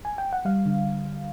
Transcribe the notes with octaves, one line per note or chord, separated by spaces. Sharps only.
G#5
G5
F#5
G3 F5
D3